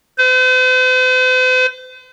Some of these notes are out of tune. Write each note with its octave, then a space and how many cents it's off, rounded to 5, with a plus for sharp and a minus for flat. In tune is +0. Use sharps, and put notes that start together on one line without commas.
C5 -45